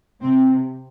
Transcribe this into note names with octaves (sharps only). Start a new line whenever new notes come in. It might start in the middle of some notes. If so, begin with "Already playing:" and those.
C3 C4